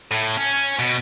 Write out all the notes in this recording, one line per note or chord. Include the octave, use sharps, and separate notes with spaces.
A2
C#4
B2